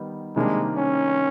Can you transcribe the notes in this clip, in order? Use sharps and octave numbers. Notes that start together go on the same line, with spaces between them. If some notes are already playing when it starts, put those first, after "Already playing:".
Already playing: D#3 G3 B3 D#4
C3 D#3 G3 G#3 A#3 D4
C#4